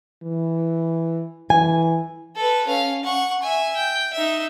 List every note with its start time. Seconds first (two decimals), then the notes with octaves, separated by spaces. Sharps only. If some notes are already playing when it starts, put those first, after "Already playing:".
0.23 E3
1.50 E3 G#5
2.36 A4 B4
2.67 C#4 F5
3.04 F#5 C#6
3.42 E5 G#5
3.76 G5
4.13 D#4 E5